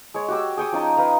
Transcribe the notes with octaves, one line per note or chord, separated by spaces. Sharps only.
G#3 C#5
F#4 G4 E6
G#4 G5 C#6 D#6
F3 C#4 D#4 A5
B4 F5 A#5 D#6